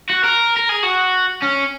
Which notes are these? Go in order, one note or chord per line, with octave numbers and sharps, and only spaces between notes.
F#4
A#4
A#4
G#4
F#4
C#4